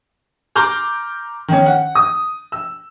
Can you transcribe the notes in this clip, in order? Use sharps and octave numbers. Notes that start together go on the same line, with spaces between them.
A#5 C6 D6 F6 G6
D#3 C#4
F#5
D#6
E6